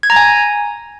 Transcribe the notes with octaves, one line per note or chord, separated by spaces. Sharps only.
G#6
A#5
G#5